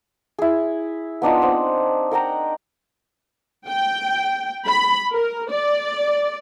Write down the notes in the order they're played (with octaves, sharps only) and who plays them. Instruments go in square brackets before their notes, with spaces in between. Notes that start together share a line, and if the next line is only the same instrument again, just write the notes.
[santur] E4 G#4
B3 D4 D#4 F4
C4 F#5
A#4 F#5 G5 A#5
[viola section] G5
B5
A#4
D5